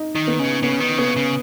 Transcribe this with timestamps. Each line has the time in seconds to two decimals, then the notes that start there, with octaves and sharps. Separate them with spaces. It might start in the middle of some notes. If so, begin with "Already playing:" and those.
Already playing: D#4
0.15 D#3
0.27 B3
0.39 C#3
0.63 C#3 B3
0.80 D#3
0.98 C#3 B3
1.16 C#3